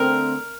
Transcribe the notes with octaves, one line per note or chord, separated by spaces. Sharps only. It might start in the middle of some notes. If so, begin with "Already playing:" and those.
Already playing: D3 A3 C4 A#4